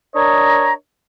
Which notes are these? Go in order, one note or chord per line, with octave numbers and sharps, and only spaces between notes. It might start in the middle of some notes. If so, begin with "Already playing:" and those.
D4 A#4 C#5 D#5 A#5